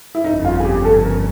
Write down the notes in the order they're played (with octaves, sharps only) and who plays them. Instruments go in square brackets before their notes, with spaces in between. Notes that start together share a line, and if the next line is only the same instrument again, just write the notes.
[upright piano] E4
[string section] G1 F2 C#3 [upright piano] D#4
[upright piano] F4
G#4
G4
A4
A#4